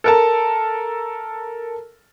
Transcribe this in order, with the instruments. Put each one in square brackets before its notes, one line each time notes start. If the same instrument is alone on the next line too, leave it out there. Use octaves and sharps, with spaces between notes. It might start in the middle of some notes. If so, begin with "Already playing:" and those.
[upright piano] A4 A#4 A5